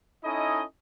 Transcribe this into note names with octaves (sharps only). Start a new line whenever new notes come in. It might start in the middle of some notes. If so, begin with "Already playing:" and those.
C#4 D#4 E4 A4 D#5